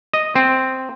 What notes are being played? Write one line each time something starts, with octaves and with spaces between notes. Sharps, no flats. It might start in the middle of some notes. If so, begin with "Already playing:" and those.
D#5
C4